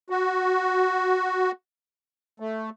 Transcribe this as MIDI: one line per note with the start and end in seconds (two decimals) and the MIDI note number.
0.10 1.51 66
2.40 2.70 57